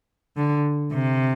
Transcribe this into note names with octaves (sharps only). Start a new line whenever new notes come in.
D3
C3